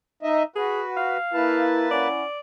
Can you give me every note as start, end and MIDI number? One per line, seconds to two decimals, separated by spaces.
0.23 0.43 63
0.23 0.43 75
0.23 0.43 76
0.56 1.17 66
0.56 0.82 68
0.56 1.17 71
0.97 1.64 77
1.33 2.08 58
1.33 1.86 64
1.33 2.08 71
1.33 2.08 81
1.91 2.23 61
1.91 2.23 64
1.91 2.40 74
1.91 2.23 78